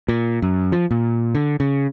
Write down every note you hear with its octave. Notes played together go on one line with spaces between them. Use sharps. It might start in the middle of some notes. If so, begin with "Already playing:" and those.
A#2
F#2
F3
A#2
D3
C#3